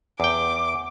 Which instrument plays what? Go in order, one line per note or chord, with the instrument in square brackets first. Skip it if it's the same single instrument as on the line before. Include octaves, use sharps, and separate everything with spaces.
[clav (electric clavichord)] E2 G5 [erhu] D6